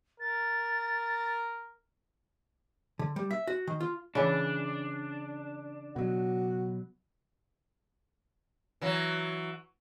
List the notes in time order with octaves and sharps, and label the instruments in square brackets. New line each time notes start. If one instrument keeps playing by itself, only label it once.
[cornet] A#4 [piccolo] A6
[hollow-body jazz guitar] D3
G3
E5
F#4
D#3
F4
[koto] C#3 E3 E4 [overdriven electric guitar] D4
[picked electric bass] B2 F#3 [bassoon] F#4
[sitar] E3 F#3